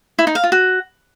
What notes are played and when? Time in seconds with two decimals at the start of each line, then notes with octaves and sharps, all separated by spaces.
0.19 E4
0.27 D#4
0.35 F5
0.44 F4
0.52 F#4